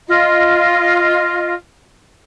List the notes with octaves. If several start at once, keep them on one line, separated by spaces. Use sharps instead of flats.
F4 D#5